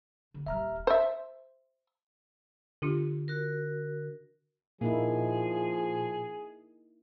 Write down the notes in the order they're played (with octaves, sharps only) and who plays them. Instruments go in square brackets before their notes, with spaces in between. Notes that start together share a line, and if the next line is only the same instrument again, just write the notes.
[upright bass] D3
[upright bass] D#1 G3 [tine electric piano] E5 A#5 F6
[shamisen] C5 E5
[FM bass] D3 [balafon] D4 F4 G4
[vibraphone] F#4 A#4
[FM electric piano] A#2 [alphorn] F3 [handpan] A#3 D#4 E4 [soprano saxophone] G#4